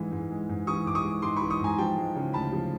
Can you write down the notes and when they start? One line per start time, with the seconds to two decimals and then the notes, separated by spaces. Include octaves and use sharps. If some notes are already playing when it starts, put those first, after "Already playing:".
Already playing: G#2 E3 G#3
0.12 G#2
0.30 G#3
0.49 G#2
0.67 E3 C#6 D#6
0.86 G#2 D6
0.95 C#6 D#6
1.04 G#3
1.22 G#2 C6 D6
1.36 B5 C#6
1.41 E3
1.50 C#6 D#6
1.60 G#2 G#5 A#5
1.78 F3 G5 A5
1.97 G#3
2.15 C#3
2.33 D2 A5 B5
2.52 F3